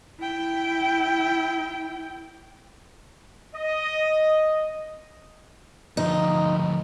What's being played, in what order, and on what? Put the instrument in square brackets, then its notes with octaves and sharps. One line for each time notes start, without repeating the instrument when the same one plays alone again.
[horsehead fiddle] E4 G5
[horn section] D#5
[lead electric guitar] D2 F3 [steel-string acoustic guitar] D#4